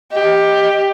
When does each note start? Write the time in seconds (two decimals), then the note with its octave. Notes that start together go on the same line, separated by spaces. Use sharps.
0.12 G4 D#5